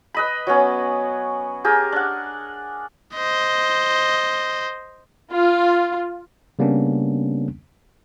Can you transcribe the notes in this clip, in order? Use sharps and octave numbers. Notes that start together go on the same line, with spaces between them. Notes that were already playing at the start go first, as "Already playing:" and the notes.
B4 D#5 B5
F#3 B3 C#4
G4 G#4 A#4
D4 F#5
C5 D#5
F4
C#3 G3 A#3 B3 C#4 D4